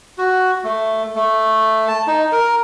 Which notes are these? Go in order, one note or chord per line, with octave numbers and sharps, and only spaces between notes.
F#4
A3
A3
A5
D#4
A#4